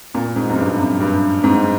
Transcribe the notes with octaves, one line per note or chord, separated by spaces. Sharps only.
A#2
G#2
F#2
G2
F#2
G2
G#2